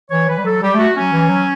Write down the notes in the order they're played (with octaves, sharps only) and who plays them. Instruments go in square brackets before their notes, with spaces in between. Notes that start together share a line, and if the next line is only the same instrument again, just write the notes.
[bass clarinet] E3 [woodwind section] C#5
[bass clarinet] E3 [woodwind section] B4
[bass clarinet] G3
[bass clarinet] F#3 [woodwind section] A4
[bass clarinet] G3 [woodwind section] G4
[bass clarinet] A3 [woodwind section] F#4
[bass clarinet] F#3 [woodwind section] C#4
[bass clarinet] E3
F#3